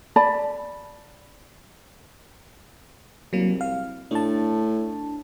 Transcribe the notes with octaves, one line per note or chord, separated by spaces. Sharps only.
D5 A5 B5
C2 F#3 A#3
F5
A2 D4 A5